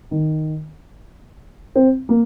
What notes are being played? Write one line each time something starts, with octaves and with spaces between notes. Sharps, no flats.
D#3
C4
A#3